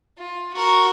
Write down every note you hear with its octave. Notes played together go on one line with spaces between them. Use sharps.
F4
F#4 A#4